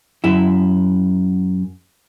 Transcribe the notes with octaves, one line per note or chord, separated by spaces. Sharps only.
F#2 E4